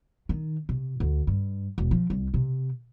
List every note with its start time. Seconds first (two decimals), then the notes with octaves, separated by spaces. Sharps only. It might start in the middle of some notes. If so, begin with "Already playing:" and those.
0.29 D#3
0.69 C3
1.00 D2
1.27 G2
1.78 E1
1.91 F3
2.10 C2
2.34 C3